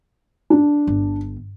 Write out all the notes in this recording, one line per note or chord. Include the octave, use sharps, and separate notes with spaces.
D4
G1